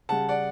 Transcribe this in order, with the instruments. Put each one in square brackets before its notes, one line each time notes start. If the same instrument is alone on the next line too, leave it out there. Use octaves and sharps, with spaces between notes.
[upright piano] C#3 G3 F#5 A5
D5 F#5